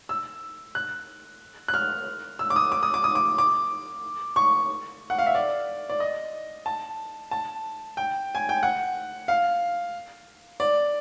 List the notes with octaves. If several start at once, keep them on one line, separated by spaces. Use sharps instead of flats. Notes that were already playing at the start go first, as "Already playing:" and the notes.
E6
F#6
F#6
F6
E6
D6
D#6
D6
D#6
D6
D#6
D6
D6
C#6
F#5
F5
E5
D5
D5
D#5
A5
A5
G5
G#5
G5
F#5
F5
D5